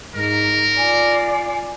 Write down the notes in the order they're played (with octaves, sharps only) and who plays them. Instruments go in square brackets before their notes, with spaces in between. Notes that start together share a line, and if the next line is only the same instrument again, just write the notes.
[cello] G#2 [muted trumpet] A#4
[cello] F4 D5 [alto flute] G#5